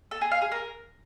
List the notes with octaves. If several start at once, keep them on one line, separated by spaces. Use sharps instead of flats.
A4
G#4
F5
G#4
A#4